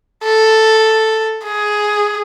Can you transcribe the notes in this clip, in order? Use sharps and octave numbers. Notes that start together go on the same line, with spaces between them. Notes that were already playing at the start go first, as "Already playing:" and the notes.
A4
G#4